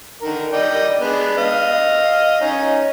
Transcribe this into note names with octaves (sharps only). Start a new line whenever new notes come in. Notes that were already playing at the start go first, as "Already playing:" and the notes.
D3 D#3 A#4
D5 D#5 G5
G#3 B3 D4
D#5 F5
C#4 D#4